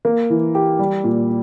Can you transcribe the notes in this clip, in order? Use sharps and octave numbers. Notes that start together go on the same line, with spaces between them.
A#3
E3
G4
G3
A#2